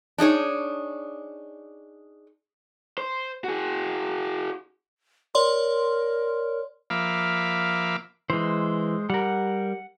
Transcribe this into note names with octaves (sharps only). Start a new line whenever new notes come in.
D4 D#4 G#4 C#5
C5
F#4 G#4
A#4 C#5 D5 C6
F3 A#3 E5 F5 B5 D6
E3 G#3 C5
G3 A#4 F#5